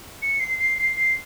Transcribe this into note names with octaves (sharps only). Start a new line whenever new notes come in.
C#7
C7
C7
C7
C7